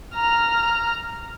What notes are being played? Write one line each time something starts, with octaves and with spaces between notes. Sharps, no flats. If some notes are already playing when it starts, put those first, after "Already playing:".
A#5 F6